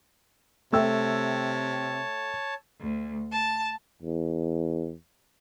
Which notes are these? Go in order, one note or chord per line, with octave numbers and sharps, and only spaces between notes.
C3 A3 C#5 G5 A5 E6
D2
A5
E2